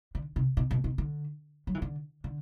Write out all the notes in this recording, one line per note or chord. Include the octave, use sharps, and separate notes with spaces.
D3
C3
B2
B2
B2
D3
F#3
E3
D3
D3